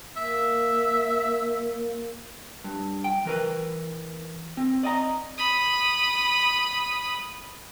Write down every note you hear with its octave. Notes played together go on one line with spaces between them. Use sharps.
A#3 E5
G2
G5
E3 A#4 B4
C4
D5 D#5 F5 A#5
B5 D#6